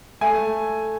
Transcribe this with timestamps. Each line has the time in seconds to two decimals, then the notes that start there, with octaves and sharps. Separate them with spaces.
0.21 A3 G#5
0.38 A3